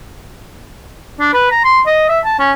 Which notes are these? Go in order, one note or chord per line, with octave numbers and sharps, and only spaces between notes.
D4
B4
A#5
C6
D#5
E5
A5
C#4